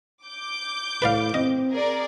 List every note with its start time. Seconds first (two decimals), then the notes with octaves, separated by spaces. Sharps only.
0.25 D6 G6
1.02 A2 B4 D5 F5
1.34 C4 D#5
1.71 G#4 A#4 D5